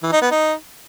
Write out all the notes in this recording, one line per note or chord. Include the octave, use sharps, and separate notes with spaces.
E3
D#4
B3
D#4